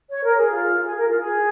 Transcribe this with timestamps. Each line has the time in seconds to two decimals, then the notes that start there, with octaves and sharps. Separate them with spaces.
0.11 C#5
0.24 A#4
0.38 G#4
0.51 F4
0.85 G#4
0.97 A#4
1.08 F4
1.20 G#4